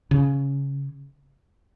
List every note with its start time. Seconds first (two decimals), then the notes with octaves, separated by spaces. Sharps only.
0.11 C#3